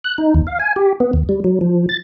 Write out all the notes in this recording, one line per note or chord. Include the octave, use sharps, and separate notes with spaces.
F#6
D#4
D#2
F5
G#5
G4
B3
D#2
G3
F#3
F3
A6